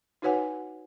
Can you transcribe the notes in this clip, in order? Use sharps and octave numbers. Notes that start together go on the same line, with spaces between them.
D#4 F#4 B4 C#5 F#5 G#5